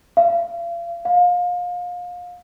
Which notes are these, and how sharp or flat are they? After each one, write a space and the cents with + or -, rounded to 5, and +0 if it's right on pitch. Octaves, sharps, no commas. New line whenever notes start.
F5 -35
F5 +30